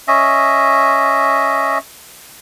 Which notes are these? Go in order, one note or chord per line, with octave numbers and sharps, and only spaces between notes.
C#4 D#5 E5